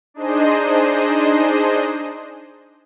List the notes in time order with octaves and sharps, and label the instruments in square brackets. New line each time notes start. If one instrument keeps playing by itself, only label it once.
[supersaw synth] D4 D#4 G#4 C5 D#5